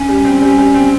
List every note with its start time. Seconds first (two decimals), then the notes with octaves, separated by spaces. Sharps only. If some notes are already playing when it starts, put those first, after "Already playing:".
Already playing: C#4
0.08 G3
0.25 C4
0.42 G3
0.58 G3
0.74 C4